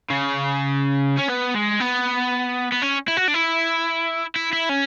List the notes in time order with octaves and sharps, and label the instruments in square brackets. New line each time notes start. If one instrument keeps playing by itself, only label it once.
[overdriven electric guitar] C#3
C#4
B3
G#3
B3
B3
C#4
E4
F#4
D4
E4
E4
E4
C#4